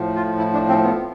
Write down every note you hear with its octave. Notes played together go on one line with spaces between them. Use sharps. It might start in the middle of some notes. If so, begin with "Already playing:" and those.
Already playing: A2 F3
F4
E4
D4
C4
B3